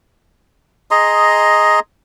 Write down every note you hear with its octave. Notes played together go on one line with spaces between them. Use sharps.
G#4 D#5 A#5 C6